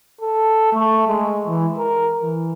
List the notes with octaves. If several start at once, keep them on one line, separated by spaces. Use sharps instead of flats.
A4
A3
G#3
E3
A#4
E3